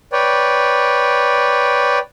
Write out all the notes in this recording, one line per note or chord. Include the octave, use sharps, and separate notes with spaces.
B4 C#5 D5 G5